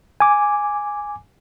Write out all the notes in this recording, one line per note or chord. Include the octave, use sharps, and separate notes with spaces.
G#5 D6